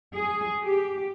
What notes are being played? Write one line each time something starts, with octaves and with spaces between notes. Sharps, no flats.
G#4
G4